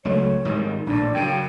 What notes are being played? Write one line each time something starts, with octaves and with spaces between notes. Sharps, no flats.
C#2 F#3 A3 C#5
G#2 D#3 G3
A#1 A2 D4
F#2 C#3 G5